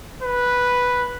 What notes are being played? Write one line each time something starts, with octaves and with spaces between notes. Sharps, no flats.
B4